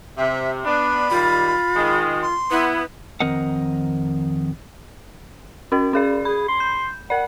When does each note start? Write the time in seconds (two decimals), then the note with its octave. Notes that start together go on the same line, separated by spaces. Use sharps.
0.17 C3 E5
0.65 B3 D4 B5
1.11 D#3 G3 F4
1.75 D#3 G#3
2.22 C6
2.51 B3 E4
3.20 F2 D#3 C4 A#4 D#5 F#5
5.72 C#4 F#4 A#4
5.93 C#4 G#4 D5
6.25 G#4 B5
6.48 C6
6.60 G6
7.10 A#4 D5 F#5